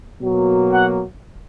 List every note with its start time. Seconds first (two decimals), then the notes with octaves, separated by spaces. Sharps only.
0.20 B2 F#3 A#3
0.72 F#5